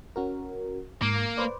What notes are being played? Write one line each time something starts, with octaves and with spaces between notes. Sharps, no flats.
C#4 F#4 A#4
G#2 A#3
B4 C5 D5